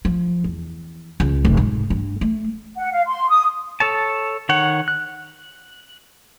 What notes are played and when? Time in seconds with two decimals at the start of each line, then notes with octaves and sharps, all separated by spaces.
0.05 F3
0.44 E2
1.20 C#2
1.45 F1
1.57 G#2
1.90 G2
2.21 A3
2.77 F#5
2.93 F5
3.07 C6
3.29 D#6
3.80 A4 C#5 A5
4.49 D#3 C#5 F#5
4.88 F#6